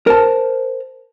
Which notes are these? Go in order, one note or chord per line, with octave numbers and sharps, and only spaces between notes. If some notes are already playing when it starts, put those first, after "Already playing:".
A#4 C5 A5